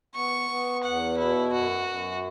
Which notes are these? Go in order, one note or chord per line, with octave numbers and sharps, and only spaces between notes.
B3 C#6
B3
E2 F#5
B2 E4
F#2 F#4
F#2